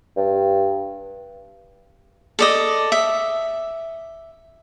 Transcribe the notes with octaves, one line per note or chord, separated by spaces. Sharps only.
G2
A4 D5 D#5
E5